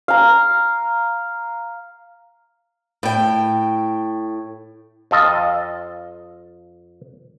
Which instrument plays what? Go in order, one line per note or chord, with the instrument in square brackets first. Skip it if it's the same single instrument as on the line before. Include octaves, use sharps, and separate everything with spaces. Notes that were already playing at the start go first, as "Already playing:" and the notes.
[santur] F5 A#5
[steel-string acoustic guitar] A2 G5
[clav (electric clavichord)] F2 F4 A4 D#5 A5